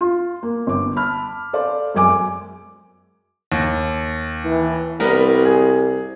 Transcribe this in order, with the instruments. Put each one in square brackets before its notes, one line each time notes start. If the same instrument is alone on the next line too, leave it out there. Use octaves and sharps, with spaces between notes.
[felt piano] F4
A#3
G1 D6
A5 B5 F6
A4 C5 D5 F5
F#2 G#3 G#5 D6
[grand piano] D#2
[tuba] E3
[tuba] C2 [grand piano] G3 B3 A#4
[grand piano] G#4